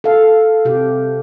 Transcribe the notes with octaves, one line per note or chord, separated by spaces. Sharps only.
A4 F5
C3 G4